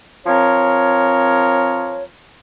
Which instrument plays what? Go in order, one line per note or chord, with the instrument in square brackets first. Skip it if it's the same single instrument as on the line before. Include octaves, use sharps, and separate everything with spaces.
[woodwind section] F3 C4 A#4 C#5